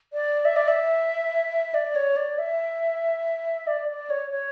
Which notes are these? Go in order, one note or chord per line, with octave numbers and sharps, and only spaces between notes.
D5
E5
D5
E5
D5
C#5
D5
E5
D5
D5
C#5
C#5